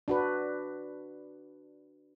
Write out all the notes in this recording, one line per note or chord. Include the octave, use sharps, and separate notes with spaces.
D4 F#4 B4